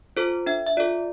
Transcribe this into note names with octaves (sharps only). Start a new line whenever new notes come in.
F4 A4 C5
D4 E5
E5
F4 A4 D5